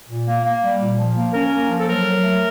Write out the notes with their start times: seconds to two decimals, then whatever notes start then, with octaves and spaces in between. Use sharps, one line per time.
0.09 A#2
0.27 A#3
0.44 A#3
0.63 G3
0.80 A#2
0.98 F3
1.15 A#3
1.34 C#4 A#4
1.52 A#3
1.70 F3
1.79 A4
1.87 F#3 A#4
2.05 F#3
2.23 A3